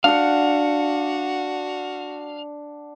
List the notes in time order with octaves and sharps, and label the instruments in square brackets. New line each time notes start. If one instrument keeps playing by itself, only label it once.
[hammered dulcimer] D4 F#5 [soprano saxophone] F#4 [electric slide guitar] F5